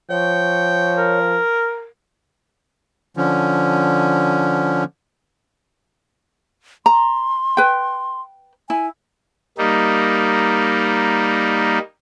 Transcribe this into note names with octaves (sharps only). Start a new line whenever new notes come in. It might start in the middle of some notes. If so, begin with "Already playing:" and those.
F3 C#5 G5
A#4
D3 F3 C#4
A#5 C6
B4 G5
E4 G#5
G3 A#3 D#4